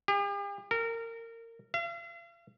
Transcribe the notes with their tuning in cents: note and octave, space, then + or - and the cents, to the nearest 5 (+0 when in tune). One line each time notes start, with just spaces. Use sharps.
G4 +45
A#4 -25
F5 -45